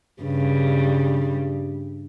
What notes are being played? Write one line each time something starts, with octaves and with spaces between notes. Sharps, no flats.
G2 C#3 G3